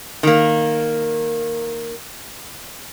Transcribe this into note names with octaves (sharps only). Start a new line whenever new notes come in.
D#3 A#3